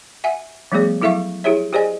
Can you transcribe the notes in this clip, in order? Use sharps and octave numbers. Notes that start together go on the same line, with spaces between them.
E5 F#5 G#5
F3 G3 A3 B3 G#4 D5
F#3 E4 A4 E5 F5 C#6
E4 G4 G#4 C#5 E5
G4 G#4 C5 D5 D#5 G#5